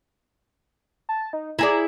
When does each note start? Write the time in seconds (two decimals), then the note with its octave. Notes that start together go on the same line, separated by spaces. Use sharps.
1.09 A5
1.33 D#4
1.59 E4 G#4 D5 A#5